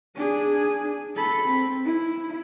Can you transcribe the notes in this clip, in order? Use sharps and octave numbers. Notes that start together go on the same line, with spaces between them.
D4 G#4
A4 B5
C4
E4